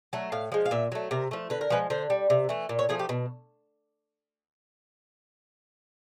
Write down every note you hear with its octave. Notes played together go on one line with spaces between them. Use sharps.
F#3 A3
A2 F5
F3 G#3
F5
A#2 E5
F#3 A3
C3 A#4
F3 A3
D3 B4
A#4
F3 G#3 B4
D3 C5
G3
C3
E3 A3
A#2
C#5
F3 A3 G#4
G4
B2